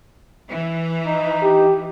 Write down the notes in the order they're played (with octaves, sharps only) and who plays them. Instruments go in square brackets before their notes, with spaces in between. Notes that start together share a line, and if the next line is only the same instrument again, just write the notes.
[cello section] E3
[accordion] D#4
[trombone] G4